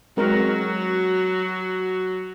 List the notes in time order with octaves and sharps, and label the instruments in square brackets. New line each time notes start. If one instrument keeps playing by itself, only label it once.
[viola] F#3 F#4 [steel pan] G#3 C4 A#4